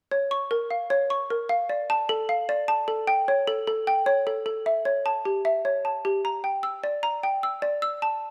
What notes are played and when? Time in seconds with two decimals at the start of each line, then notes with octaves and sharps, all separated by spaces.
0.11 C#5
0.31 C#6
0.51 A#4
0.71 F5
0.90 C#5
1.10 C#6
1.30 A#4
1.49 F5
1.69 D5
1.90 A5
2.09 A4
2.29 F5
2.49 D5
2.68 A5
2.88 A4
3.07 G5
3.28 C#5
3.47 A4
3.67 A4
3.87 G5
4.06 C#5
4.27 A4
4.46 A4
4.66 E5
4.85 C#5
5.06 A5
5.25 G4
5.45 E5
5.65 C#5
5.85 A5
6.05 G4
6.25 A#5
6.44 G5
6.63 E6
6.83 D5
7.03 A#5
7.23 G5
7.43 E6
7.62 D5
7.82 E6
8.02 A5